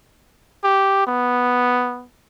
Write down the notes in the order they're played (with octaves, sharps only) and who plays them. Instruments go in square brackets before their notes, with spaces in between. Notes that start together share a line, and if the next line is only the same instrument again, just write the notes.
[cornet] G4
B3